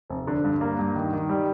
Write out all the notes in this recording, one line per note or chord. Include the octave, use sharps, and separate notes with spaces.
F1
D3
G2
A#3
G2
D#3
D#3
G3